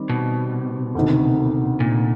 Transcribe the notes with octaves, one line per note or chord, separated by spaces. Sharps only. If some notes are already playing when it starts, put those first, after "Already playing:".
Already playing: D#3 G3 C4
B2
D2 C3 D#3
A#2